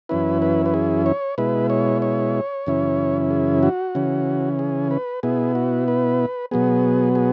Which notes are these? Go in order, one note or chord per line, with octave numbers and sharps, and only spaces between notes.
F#2 E3 C#4 E4 B4
B4
B4
G#4
C#5
B2 G#3 E4 B4
C#5
C#5
F#2 C#3 E3 C#4 E4
G#4
F#4
C#3 E3 C#4
G#4
B4
B2 B3 E4 G#4
F#4
B4
B2 F#3 B3 G#4
G#4